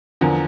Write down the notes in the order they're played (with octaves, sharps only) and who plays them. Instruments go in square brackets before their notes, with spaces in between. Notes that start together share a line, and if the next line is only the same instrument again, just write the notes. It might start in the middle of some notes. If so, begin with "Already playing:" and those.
[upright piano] E2 D3 F3 A#4